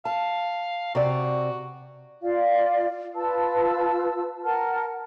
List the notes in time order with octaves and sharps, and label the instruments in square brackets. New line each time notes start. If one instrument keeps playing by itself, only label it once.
[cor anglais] F5 [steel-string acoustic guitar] A5
[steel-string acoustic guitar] C3 D5 [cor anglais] F#4
[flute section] F4 D5 F5
F4 B4 A5 E6
A#4 F#5 A5 F6